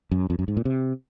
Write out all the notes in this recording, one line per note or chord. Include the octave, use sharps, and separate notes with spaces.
F#2
F2
F#2
G#2
A#2
C3